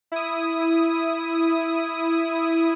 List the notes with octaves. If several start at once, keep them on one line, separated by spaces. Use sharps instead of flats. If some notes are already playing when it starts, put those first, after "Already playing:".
E4 D#6